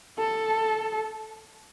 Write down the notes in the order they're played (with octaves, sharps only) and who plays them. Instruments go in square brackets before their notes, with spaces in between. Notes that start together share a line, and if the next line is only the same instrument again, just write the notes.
[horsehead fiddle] A4